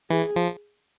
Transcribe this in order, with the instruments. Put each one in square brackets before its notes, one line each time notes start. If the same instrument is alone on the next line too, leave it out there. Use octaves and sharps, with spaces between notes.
[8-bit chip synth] E3 [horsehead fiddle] G#4
[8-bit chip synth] F3